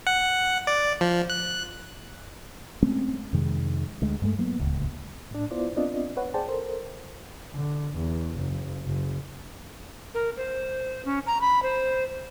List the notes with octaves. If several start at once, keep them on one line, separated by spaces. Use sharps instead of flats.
F#5
D5
F3
F#6
G#3 A3 C4 C#4
F2 C3 D#3 G#3
D2 G#3
G2 G#3 A3
F#3 A#3 B3
D1 C#2
A2 D4
B3 E4 F4 C5 D5
B3 C4 D4 F4 D5 D#5
B4 C#5 F#5
G#4 C5 D5 G5 A5
A4 A#4 C5
D3
E2
F#1
F#1
A#4
C5
C#4
A#5
B5
C5